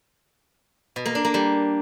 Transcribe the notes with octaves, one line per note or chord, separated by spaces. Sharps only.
B2
A#3
D4
A#3
G3